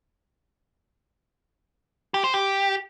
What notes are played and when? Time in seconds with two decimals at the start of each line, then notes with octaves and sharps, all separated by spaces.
2.14 G4
2.24 C5
2.34 G4